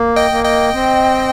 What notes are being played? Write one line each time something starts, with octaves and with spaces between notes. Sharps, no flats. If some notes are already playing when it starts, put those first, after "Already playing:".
Already playing: A#3
D#5 G5
A#3
D#5 G5
C4